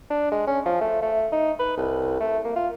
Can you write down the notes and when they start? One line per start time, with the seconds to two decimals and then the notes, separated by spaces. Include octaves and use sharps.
0.10 D4
0.31 G#3
0.47 C#4
0.65 F3
0.81 A3
1.02 A3
1.32 D#4
1.59 B4
1.77 C2
2.20 A3
2.44 A#3
2.56 F4